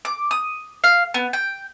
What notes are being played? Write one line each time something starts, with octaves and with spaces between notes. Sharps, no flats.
D6
D#6
F5
B3
G5